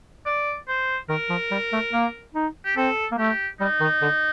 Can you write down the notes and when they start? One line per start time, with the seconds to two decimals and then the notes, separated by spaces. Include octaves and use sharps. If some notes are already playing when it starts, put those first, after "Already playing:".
0.26 D5
0.68 C5
1.09 D#3 A#4
1.30 F3
1.51 G3
1.72 A3
1.93 A#3
2.34 D#4
2.65 G4
2.76 C4 A4
3.12 A#3
3.18 A3 G4
3.60 G3 D#4
3.81 D#3
4.02 D3